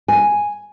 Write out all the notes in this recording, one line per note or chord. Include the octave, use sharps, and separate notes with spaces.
G#5